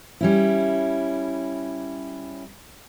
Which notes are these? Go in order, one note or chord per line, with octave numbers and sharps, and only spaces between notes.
G3 C#4 E4